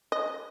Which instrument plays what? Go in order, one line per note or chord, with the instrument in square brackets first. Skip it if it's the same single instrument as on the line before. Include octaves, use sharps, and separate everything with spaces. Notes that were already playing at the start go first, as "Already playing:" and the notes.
[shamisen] D#5